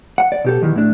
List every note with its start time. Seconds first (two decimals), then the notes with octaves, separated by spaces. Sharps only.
0.18 F#5
0.32 D5
0.44 B2 G4 A4
0.62 E2 D#3 E3
0.76 A2 D4